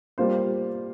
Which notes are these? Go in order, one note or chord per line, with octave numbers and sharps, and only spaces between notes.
G3 A#3 F4 C5